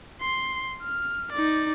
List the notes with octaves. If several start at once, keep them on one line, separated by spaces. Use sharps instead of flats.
C6
F6
D#4 D5